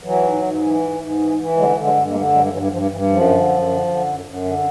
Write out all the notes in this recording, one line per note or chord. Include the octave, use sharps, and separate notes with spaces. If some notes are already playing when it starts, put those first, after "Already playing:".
E3 F#3
G#2
G#2
E3
G#2
G#2
E3
E3
D3 F#3 G#3
D3
F#3 G#3
G2
G#3 A#3
D3
G2 F#3 G#3
G2 E3 F#3
G2 F3
G2 E3
F#2 F3
D3
F#2
D3
D3
F#2
F#2
D3